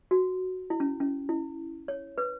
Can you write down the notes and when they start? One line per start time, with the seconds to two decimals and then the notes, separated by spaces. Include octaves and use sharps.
0.11 F#4
0.70 E4
0.80 C#4
1.00 C#4
1.29 E4
1.88 C#5
2.18 B4